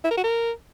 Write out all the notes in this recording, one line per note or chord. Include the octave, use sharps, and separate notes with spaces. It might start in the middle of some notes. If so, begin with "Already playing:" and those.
E4
A#4
F#4
A#4